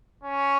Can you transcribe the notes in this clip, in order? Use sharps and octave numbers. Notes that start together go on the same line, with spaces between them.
C#4